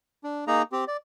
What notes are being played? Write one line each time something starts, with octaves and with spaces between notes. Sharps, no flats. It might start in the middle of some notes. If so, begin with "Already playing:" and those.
D4
A#3 D#4 G#4 A#5
C4 G4
D5